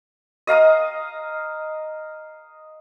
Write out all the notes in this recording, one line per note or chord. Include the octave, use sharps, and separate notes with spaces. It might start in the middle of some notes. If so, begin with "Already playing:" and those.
D#5 F5 A#5 D#6